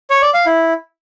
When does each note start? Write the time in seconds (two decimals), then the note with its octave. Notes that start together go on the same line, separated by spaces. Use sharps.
0.10 C#5
0.22 D5
0.34 F5
0.46 E4